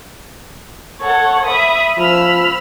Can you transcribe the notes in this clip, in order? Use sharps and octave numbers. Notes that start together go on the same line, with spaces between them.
A4 C#5 F#5
E5 B5 D#6
F3 B5 E6 F6